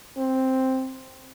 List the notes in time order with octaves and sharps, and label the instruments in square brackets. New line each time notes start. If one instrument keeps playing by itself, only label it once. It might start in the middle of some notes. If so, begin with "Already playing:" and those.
[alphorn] C4